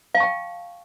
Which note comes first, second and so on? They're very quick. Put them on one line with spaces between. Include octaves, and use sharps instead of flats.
F5 A5 C#6 G5